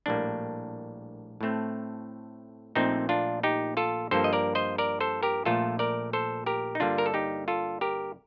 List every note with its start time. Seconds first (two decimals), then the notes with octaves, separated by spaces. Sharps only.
0.06 A#1 A2 G3 A#3 D4
1.41 A2 A3 C4
2.75 A#1 A#2 A3 C4 D#4
3.09 D4 F4
3.43 D#4 G4
3.77 F4 A4
4.11 G2 F3 A#3 A4 C5
4.24 D#5
4.33 A#4 D5
4.55 C5 D#5
4.78 A#4 D5
5.01 A4 C5
5.23 G4 A#4
5.45 A#1 A#2 A3 F4 A4
5.79 A#4 D5
6.13 A4 C5
6.46 G4 A#4
6.75 D#4
6.80 G2 D3 G3 A#3 D4 F4
6.98 A#4
7.06 A4
7.14 D#4 G4
7.48 F4 A4
7.81 G4 A#4